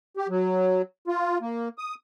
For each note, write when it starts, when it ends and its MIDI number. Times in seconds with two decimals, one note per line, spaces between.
0.17 0.27 67
0.29 0.82 54
1.08 1.38 65
1.41 1.69 58
1.78 1.95 87